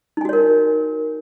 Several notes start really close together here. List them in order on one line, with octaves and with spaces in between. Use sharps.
D#4 G#5 F#4 C#5 A#4